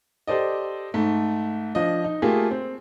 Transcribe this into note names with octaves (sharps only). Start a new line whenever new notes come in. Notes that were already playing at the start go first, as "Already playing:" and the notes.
G4 A4 C5 D5 D#5
G#2 A3
F3 D4 D#5
D#4
A3 A#3 F4 G4 G#4
C4